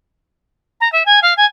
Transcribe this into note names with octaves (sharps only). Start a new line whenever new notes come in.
A#5
E5
G#5
F5
G#5